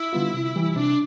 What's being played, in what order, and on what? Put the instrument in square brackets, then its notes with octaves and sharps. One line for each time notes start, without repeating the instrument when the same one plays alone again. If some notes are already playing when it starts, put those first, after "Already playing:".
Already playing: [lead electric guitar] E4
[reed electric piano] D3 G3 B3 F4
C3
E3 G3
[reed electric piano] C3 [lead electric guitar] D4